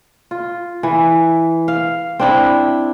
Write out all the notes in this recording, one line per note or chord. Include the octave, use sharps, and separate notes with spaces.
F4
E3
F5
C4 D4 E4